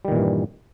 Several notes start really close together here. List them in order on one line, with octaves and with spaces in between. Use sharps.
G3 D#3 A#2 E3 G2